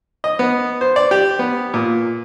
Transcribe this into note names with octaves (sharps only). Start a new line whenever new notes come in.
D#5
B3
C5
D5
G4
B3
A#2